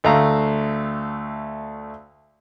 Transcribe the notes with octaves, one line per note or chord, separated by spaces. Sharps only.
D2 A3 F5 A#5